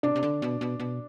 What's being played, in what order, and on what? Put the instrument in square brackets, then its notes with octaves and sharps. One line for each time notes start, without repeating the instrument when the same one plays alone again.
[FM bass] C3 [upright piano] D4
[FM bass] C3
D3
B2
B2
B2